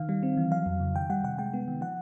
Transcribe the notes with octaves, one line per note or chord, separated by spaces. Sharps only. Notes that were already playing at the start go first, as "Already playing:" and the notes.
Already playing: D#3 F5
G3
C4
E3
F#3 F5
F2
C#3
D#3 G5
G3 F#5
C3 F#5
G#3 G5
B3
D#3
F3 F#5